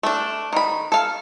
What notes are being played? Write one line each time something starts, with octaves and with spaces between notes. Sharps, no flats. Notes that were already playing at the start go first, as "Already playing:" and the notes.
A3 D4
D#3 B5
A4 F5